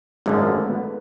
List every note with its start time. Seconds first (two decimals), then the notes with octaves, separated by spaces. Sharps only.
0.26 G#1 F#2 D3 F3 G#3
0.47 A3
0.68 B3